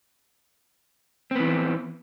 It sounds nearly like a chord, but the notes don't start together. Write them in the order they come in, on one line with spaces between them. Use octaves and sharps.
C4 B3 E3